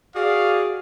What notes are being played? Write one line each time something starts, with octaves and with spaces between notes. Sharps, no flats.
F#4 G#4 D5 F5